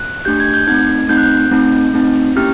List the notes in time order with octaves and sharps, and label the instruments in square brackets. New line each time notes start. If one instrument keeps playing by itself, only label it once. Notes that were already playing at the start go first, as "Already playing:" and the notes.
Already playing: [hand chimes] F#6
A3 D4 G4 G6
G#6
G6
A3 C4 D#4 G#6
A3 C4 D#4 G6
F#6
G6
A3 C4 D#4
A3 C4 D#4
A#3 C#4 E4 G4 F6